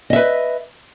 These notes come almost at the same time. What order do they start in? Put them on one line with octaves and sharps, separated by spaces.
D#5 E5 B4